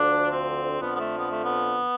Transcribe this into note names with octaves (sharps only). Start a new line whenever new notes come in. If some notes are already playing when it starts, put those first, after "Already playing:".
Already playing: D2 D3 F3 D4
C4
F2 D3 F3 B3
B3
A3
B3
A3
B3